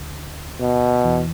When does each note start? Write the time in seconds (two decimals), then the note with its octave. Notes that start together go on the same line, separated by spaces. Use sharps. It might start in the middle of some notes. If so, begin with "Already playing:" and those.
Already playing: D2 D3
0.60 B2
1.05 E2 E3